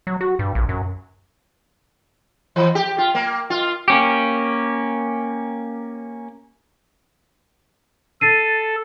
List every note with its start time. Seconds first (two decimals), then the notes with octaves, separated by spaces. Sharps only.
0.07 F#3
0.21 F#4
0.39 G2
0.55 A#1
0.69 F#2
2.56 E3
2.75 G4
2.98 F4
3.15 A#3
3.50 F4
3.88 A#3 C#4 G4
8.21 A4 A6 C7 D#7